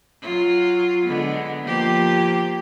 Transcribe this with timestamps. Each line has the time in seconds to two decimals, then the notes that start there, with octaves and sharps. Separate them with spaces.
0.22 F#3 F4
1.06 D3 G#3 B3
1.63 F3 A#3 G4